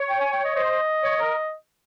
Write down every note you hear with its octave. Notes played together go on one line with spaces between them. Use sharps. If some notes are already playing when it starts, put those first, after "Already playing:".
Already playing: C#5
G5
G#5
G5
D#5
C5 D#5
C#5
A#4